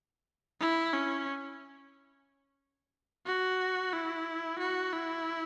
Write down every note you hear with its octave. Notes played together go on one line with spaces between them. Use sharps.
E4
C#4
F#4
E4
F#4
E4